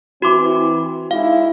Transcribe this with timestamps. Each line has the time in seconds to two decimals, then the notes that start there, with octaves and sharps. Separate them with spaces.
0.22 E3 C4 E4 F#4 C6 D6
1.11 G#3 D#4 E4 F5